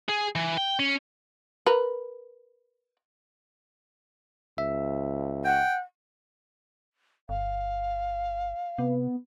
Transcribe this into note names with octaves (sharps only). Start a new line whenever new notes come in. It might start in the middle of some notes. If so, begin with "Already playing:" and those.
G#4
E3
G5
C#4
A#4 B4
C#2 E5
F#5 G5
G1 F5
C3 B3